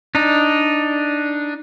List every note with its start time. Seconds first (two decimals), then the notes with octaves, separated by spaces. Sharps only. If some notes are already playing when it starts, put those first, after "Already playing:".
0.15 D4 D#4